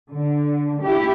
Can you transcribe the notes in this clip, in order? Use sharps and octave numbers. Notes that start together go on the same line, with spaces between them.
D3
E4 G4